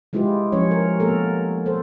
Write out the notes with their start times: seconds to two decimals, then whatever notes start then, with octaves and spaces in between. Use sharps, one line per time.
0.13 G3 G#3 E4 F4 G4 B4
0.52 F3 G3 C#4 C#5
0.71 A#4
1.00 A#3 B3 A4 A#4
1.66 A4 C5